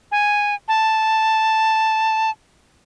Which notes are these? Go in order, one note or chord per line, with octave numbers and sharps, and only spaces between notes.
G#5
A5